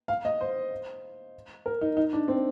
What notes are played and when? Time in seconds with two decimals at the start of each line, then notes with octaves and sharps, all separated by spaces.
0.08 F5
0.25 D#5
0.41 C5
1.66 A#4
1.81 D#4
1.97 D#4
2.13 D4
2.28 C4